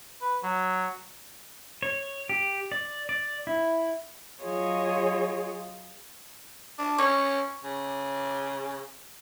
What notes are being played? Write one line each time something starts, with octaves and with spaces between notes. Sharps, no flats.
B4
F#3
C#5
G4
D5
D5
E4
F#3 F4 G#4 C#5 D#5
D4
C#4 C#6
C#3